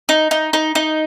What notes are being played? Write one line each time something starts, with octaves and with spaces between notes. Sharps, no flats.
D#4
D#4
D#4
D#4